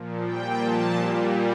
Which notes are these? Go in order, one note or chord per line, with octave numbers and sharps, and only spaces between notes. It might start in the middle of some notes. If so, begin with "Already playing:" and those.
Already playing: A#2 F3
A#2 G3 G5
A#2 F3 A5
A#2 G3